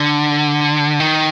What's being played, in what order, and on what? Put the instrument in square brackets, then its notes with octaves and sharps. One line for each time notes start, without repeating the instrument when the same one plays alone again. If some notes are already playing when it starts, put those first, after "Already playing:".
Already playing: [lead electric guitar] D3
D#3